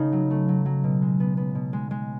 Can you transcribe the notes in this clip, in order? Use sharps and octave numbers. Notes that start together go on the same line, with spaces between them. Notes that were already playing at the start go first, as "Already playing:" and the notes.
Already playing: C#3 A3 D#4
F#3
A3
F#3
F#3
B2
G#3
B3
B3
B2
G#3
G#3